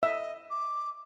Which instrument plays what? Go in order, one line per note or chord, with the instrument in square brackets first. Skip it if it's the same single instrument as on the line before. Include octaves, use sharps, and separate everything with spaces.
[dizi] D#5 [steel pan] E5
[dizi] D6